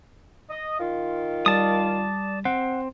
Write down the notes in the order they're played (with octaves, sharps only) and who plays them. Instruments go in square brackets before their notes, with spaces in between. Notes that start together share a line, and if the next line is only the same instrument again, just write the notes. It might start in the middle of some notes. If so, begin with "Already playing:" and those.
[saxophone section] D#5
D#3 F4
[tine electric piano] G3 [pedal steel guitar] D5 A5 D#6
[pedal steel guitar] C4 [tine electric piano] F#5